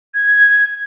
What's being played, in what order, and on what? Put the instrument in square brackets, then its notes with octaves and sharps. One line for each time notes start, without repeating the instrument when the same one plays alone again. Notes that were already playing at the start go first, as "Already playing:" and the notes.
[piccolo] G#6